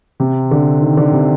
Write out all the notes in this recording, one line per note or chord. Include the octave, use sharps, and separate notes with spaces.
C3
D3
D#3
D3
C3